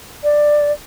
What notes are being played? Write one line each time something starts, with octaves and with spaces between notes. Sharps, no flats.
D5